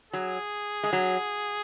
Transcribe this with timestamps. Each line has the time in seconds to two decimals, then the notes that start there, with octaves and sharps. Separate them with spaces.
0.13 F#3 G#4
0.83 G#3
0.93 F#3